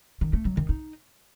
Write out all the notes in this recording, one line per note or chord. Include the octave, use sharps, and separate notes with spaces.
D#3
A3
F#3
D#3
D#4